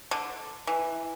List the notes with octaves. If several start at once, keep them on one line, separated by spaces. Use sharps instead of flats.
D3
E3